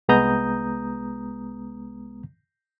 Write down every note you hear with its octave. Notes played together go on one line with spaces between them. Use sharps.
C2 G#3 B3 A#5 D#6 G6